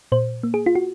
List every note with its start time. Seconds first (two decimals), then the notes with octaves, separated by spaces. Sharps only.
0.12 A#2 C5
0.43 A#3
0.54 G#4
0.66 F4
0.75 F#4